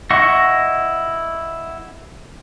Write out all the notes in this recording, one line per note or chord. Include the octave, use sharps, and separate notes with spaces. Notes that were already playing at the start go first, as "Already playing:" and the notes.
E4 D#5 F#5 C#6